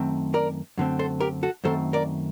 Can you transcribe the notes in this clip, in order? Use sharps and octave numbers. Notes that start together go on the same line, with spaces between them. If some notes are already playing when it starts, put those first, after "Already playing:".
Already playing: F#2 D#3 A3 C4
A#4 D5
F#2 D3 A3 C4
A4 C5
G4 A#4
F#4 A4
F#2 D#3 A3 C4 A4 C5
A#4 D5